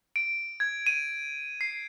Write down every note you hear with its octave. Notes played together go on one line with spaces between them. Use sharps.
D7
G#6
D#7
C7